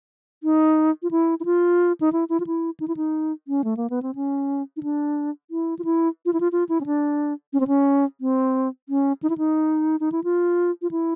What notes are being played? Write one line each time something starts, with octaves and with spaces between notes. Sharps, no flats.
D#4
F4
E4
E4
F4
D#4
E4
E4
F4
E4
D#4
E4
D#4
C#4
A3
A#3
B3
C4
C#4
D#4
D4
E4
F4
E4
F4
E4
F4
F4
E4
C#4
D4
C#4
C4
C#4
C4
C#4
D#4
E4
D#4
D#4
E4
F4
F4
E4